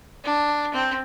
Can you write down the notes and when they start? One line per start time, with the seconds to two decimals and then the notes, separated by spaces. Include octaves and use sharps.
0.24 D4
0.73 C4